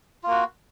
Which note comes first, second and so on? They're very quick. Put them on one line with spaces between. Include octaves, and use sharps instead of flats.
F4 A#3 F#4